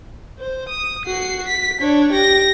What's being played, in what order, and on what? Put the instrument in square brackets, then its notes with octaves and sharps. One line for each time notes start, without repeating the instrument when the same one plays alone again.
[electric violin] C5
D#6
F#4 C7
B6
D4 C#5
G4 A#6